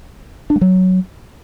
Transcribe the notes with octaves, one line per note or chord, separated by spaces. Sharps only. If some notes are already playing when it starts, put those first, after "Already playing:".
D4
G#3
F#3